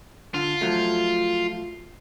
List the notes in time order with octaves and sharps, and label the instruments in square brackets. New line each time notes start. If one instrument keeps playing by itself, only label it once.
[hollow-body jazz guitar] D3 [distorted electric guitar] F4
[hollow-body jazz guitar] F3 F#3 A3